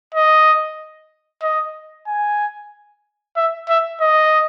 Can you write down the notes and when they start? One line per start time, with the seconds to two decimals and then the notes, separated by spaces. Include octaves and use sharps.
0.14 D#5
1.43 D#5
2.07 G#5
3.36 E5
3.69 E5
4.01 D#5